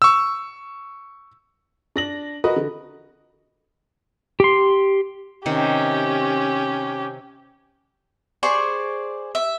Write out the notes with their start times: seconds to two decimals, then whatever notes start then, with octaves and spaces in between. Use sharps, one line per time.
0.02 C#6 E6
1.96 D4 A#6 F#7
2.44 F#4 A#4 B4 D#5
2.56 D3
4.40 G4 C6
5.46 C3 D#3 C#4 G4
8.43 G#4 C5 D5 C#6
9.35 E5